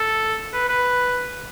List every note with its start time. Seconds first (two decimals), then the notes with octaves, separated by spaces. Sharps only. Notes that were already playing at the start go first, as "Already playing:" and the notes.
Already playing: A4
0.53 B4
0.69 B4